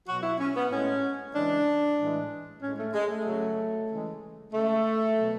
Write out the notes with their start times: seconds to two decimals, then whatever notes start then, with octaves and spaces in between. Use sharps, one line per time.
0.07 B2 F#3 F#4
0.23 E4
0.39 C#4
0.55 B3
0.71 A2 G#3 C#4
1.34 C#3 E3 G#3 D4
1.98 A2 E3 G#3
2.62 A2 G#3 C#4
2.78 A3
2.94 G#3
3.10 A3
3.26 C#3 F#3
3.89 C#3 E3 G#3
4.53 C#3 G#3 A3
5.16 B2 F#3